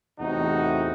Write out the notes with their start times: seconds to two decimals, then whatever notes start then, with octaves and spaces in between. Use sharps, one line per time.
0.20 E2 A2 C3 D#4 F#4 F#5